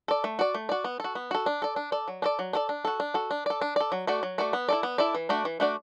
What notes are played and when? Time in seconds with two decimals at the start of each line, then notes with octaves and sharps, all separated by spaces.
0.08 A4 D5
0.24 A3
0.39 F#4 D5
0.54 A3
0.69 F#4 D5
0.84 B3
1.00 F#4 A4
1.15 B3
1.31 F#4 A4
1.46 D4
1.62 A4 D5
1.76 D4
1.92 A4 D5
2.08 F#3
2.22 D4 A4 D5
2.39 F#3
2.53 D4 A4 D5
2.69 D4
2.85 F#4 A4
3.00 D4
3.14 F#4 A4
3.31 D4
3.46 A4 D5
3.62 D4
3.76 A4 D5
3.92 F#3
4.07 A3 F#4 D5
4.23 F#3
4.38 A3 F#4 D5
4.53 B3
4.69 E4 A4 D5
4.83 B3
4.98 E4 A4 D5
5.15 E3
5.29 A3 D4 F#4 D5
5.45 E3
5.60 A3 D4 F#4 D5